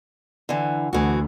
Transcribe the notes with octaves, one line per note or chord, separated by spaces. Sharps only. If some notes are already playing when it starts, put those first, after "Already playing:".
D3 E3
D2 E3 F#4